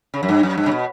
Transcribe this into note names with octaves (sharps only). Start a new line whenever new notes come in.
C#3
F#2
G2
F#2
G2
C#3
B2